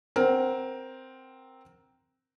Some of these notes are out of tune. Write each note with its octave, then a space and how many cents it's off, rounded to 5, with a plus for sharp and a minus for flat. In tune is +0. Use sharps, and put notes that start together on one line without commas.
C4 +0 A#4 +10 F#5 +20